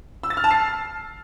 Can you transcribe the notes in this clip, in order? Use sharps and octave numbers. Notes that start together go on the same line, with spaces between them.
E6
A6
F6
A5
C7